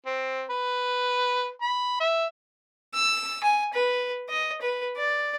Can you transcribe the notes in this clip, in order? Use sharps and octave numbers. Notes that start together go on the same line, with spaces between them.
C4
B4
B5
E5
E6
G#5
B4
D#5
B4
D5